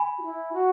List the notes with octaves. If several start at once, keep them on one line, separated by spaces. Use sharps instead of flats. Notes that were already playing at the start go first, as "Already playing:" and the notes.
Already playing: G#5 B5
F#4
E4
F#4